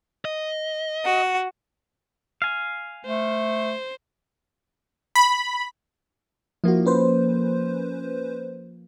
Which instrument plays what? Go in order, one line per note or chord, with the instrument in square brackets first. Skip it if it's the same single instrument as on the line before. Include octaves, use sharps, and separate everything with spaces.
[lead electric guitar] D#5
[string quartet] F#4
[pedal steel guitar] F5 G#5
[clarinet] A3 [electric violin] C5
[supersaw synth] B5
[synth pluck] F3 A#3 [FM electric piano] E4 F#4
[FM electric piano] C#4 B4 C5